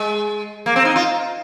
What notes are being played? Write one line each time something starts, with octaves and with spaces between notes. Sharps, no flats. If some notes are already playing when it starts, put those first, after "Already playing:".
Already playing: G#3
A#3
C4
D#4
F4